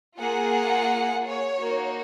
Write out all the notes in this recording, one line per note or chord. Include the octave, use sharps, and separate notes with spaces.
A#3 F4 G#4 F#5
C#5
A#3 D#4 F#4